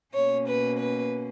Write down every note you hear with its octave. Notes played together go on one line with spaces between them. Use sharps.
B2 A#3 C#4 C#5
B4
B4